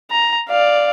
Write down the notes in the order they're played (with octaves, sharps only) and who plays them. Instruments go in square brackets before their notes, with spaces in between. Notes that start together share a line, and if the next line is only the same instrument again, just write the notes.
[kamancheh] A#5
D5 F5